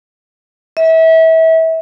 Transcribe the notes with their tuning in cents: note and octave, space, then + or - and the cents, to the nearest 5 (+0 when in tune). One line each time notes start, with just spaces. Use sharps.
E5 -30